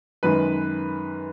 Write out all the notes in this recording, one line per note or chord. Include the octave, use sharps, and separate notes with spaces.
F#2 D#3 G#3 B4